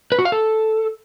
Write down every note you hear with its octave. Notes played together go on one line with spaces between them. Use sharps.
B4
F#4
F5
A4